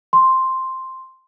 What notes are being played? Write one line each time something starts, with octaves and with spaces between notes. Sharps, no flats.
C6